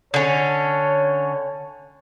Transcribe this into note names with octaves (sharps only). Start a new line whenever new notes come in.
D3 C#4 C#5